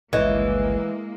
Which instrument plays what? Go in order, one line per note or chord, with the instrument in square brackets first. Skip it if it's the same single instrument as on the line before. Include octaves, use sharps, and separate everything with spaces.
[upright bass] G1 C#2 [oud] E3 [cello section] G#3 A#3 [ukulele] C#5 D#5